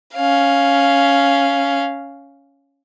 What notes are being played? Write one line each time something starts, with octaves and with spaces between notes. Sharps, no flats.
C#4 F5